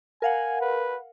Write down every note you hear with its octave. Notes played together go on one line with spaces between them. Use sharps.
A#4 F5 F#5 G#5
B4